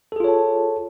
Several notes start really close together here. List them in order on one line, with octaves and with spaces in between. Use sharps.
A4 G#4 F4 C#5 A5